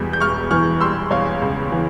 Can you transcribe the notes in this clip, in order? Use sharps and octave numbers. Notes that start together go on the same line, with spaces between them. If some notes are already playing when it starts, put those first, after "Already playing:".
Already playing: E1 E2 E3 G3
G6
E1 C#6 F6
E3 C#6 F6
G3 C6 E6
E2 C#5 F5
C#2
E3